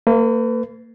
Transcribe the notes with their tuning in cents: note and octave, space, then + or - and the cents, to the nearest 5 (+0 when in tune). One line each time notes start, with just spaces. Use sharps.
A#3 -35 B4 +30